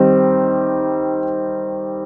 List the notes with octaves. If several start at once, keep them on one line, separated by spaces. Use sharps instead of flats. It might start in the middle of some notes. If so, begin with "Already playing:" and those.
Already playing: D#3 G3 C4 D#4